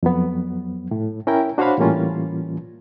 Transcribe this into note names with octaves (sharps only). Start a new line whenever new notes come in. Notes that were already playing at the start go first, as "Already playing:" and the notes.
F2 F#3 B3
A2
C#4 E4 A#4 G5
D4 F#4 C5 C#5 F5 B5
A2 E3 G3 A#3 C#4 F4